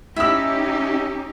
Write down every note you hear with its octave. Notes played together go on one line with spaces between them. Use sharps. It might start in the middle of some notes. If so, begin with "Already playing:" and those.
C#4 D#4 E4 G4 E5 B5 E6